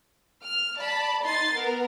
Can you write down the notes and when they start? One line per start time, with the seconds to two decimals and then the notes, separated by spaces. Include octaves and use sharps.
0.44 F6
0.76 D5 A5 B5
1.23 D#4 C6 A6 C7
1.54 B3 A#4